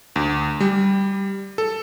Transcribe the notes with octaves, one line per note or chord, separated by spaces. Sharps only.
D2
G3
A4